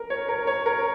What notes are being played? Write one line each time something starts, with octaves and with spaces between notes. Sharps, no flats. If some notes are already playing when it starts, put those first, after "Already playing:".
Already playing: A#4
C#5
A#4
C#5
A#4